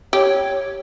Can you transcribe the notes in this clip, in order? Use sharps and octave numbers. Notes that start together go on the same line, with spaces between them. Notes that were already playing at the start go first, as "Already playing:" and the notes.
G4 C#5